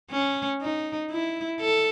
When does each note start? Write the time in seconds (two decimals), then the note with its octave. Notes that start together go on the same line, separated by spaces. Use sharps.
0.11 C#4
0.62 D#4
1.11 E4
1.61 A4